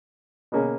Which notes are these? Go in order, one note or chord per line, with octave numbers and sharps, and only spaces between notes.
B2 A#3 C#4 G#4